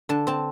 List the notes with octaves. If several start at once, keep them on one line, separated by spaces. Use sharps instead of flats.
D3 A5
C4 A5